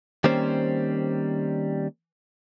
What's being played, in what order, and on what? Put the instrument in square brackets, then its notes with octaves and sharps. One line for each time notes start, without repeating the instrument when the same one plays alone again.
[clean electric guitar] D#3 G3 A#3 C4 C#4 C5